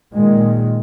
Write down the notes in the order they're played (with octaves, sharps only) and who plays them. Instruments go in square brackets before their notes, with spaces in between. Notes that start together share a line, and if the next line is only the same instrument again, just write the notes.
[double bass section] A#2 D#3 G#3